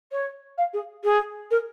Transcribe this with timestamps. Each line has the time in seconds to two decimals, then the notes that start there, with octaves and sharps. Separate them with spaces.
0.12 C#5
0.58 F5
0.73 G#4
1.04 G#4
1.51 A#4